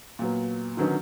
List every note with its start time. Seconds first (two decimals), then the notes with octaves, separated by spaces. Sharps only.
0.19 A#2 F#3 B3
0.77 D3 D#3 F#3 B3 C#4 D#4